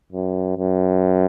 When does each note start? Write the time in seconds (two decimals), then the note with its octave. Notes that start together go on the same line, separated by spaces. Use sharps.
0.12 F#2
0.56 F#2